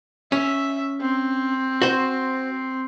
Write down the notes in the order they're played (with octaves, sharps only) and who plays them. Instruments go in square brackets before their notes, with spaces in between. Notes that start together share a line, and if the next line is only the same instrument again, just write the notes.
[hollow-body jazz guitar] C#4 [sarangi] E5
[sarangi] C4
[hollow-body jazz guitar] F#4 C5